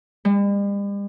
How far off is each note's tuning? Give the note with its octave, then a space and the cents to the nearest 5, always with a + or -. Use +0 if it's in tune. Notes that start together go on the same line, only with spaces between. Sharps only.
G3 +45